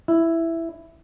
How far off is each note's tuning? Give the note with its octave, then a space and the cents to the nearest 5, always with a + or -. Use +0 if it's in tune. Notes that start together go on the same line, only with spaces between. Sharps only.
E4 +5